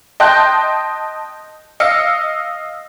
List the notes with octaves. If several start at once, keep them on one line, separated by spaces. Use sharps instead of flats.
D#5 G5 A5 C6 F#6 G6
D#5 F5 E6 C#7